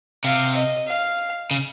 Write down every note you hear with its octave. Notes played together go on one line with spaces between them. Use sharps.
C3 F5
D#5
F5
C#3